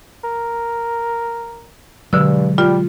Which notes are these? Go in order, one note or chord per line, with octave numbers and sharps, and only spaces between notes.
A#4
G2 B2 D3 F#3 G#3 E6
G3 F4